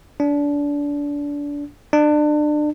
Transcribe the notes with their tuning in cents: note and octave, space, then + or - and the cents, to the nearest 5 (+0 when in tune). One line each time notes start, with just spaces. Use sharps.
D4 -25
D4 +30